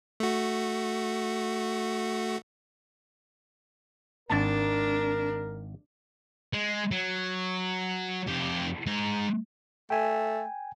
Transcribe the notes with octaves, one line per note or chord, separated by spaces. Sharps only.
A3 F#4
G#1 D4 A#4 A5
G#3
F#3
F2 G4
G#3 A#5
A3 G5 G#5